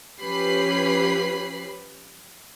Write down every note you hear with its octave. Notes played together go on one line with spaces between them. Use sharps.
F3 C#4 G4 B4 B5 C7